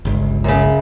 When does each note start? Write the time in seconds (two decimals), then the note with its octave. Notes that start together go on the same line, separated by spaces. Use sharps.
0.05 G1 C#2
0.44 F#2 C#3